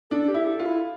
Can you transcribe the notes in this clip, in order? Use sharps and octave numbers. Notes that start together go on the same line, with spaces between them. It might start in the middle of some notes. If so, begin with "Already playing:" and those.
D4 A4
G4
E4
A4
F4
E4